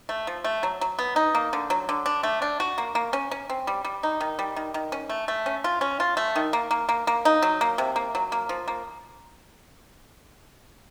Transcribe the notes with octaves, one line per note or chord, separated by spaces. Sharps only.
A3
F3
A3
F#3
F#3
B3
D#4
A#3
D3
F#3
D3
D4
A3
D4
F#4
A#3
A#3
C#4
C#4
C4
G3
G3
D#4
D#3
G3
D#3
D#3
C#4
A3
A3
C#4
F4
C#4
F4
A3
D#3
A#3
A#3
A#3
A#3
D#4
F#3
A#3
C3
A#3
F#3
A#3
F3
A#3